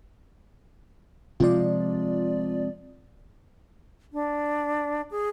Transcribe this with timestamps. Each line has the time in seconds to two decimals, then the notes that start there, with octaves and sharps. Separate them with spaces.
1.40 C3 F3 G#3 F4 D5
4.13 D4
5.11 G#4